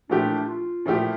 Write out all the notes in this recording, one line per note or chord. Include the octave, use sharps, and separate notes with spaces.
A#2 F3 A3 D4 E4 G4
F4
A#2 F3 A3 E4 G4